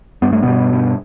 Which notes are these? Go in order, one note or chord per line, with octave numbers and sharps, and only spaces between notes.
G2 B3
A3
G2 B2 B3
G2